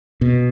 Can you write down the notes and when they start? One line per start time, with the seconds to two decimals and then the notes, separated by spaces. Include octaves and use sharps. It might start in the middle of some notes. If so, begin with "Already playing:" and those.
0.21 B2